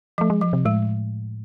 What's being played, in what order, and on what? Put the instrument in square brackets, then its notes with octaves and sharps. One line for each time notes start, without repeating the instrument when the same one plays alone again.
[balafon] F3 [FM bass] A3
[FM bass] G#3
[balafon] F3
[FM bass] C3
[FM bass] A2 [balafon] G#3